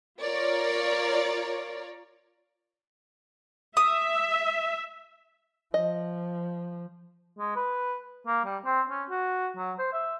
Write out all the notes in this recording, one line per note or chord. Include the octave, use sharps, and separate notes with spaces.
F4 A#4 C#5 D5
E5 D#6
F3 D#5
G#3
B4
A#3
G3
C4
C#4
F#4
F#3
C5
E5